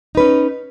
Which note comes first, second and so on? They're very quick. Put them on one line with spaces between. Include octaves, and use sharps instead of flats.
D#4 B4 C#4